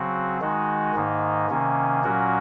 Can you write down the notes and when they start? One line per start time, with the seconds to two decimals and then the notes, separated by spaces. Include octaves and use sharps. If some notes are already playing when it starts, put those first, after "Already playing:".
Already playing: C#3 F#3 C4 F#4
0.41 D#3 G#3 D#4 F#4
0.95 G#2 D#3 A#3 D#4
1.49 C3 D#3 A#3 C#4
2.04 A#2 F#3 C#4 F#4 A#4